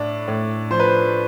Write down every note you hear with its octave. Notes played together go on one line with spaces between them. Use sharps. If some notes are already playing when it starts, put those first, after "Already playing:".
Already playing: A2 D4
A2
F3 C5
B4
C5